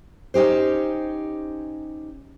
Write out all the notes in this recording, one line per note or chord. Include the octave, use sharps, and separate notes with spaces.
C#4 D#4 G4 C5